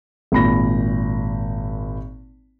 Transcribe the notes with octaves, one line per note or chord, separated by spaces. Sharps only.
G#1 A#2 B5 A#6